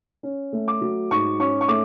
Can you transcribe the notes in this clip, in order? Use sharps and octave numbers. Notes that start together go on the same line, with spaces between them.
C#4
A3
D6
F#3
G#2 C#6
C#4 C#6
C#6
A3 D6